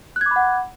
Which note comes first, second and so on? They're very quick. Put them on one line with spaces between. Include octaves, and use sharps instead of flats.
F#6 G#6 D6 B5 F#5